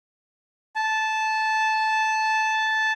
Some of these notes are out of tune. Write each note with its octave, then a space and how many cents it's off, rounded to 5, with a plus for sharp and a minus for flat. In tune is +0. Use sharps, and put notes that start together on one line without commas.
A5 -10